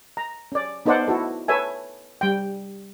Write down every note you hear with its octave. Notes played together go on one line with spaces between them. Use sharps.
A#5
C#4 D5
B3 D#4 A4 C5 D5 F#5
E4 F#4 A4
A4 B4 C#5 E5 G#5
G3 G5